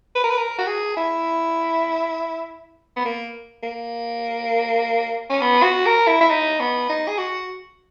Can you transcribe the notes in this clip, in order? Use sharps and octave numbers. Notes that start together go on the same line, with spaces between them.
B4
A#4
B4
A#4
F#4
G#4
E4
B3
A#3
A#3
C#4
B3
F#4
A#4
E4
E4
D#4
B3
D#4
G#4
F#4